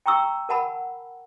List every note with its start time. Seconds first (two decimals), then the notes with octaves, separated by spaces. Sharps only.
0.06 G5 A#5 C#6 E6
0.49 A#4 F#5 A5 B5